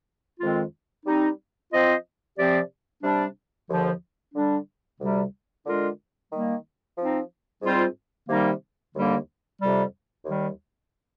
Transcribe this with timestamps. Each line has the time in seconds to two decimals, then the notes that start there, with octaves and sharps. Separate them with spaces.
0.40 F2 D#3 G#3 C4 F4
1.05 G3 C4 D#4
1.71 F3 C4 F4 C5 D#5
2.37 C3 F3 C4 G4 D5
3.02 C3 G3 D4
3.68 D#2 D3 F3
4.34 D3 G3 D4
5.00 D2 C3 G3
5.65 D3 G#3 D4 F4 A#4
6.31 D#3 G3 A#3
6.97 F3 C4 D#4
7.62 G#2 G3 C4 F4 C5
8.28 C3 D#3 G3 A#3 D#4
8.93 D#2 D3 G3 A#3 D4
9.60 F2 C3 G3
10.25 D#2 D#3 G3